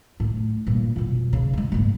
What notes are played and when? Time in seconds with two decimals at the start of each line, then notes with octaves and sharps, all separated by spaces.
0.20 A2
0.67 G2 A#2
0.96 F2 B2
1.33 C#3
1.53 G3 G#3
1.72 F#1 G#2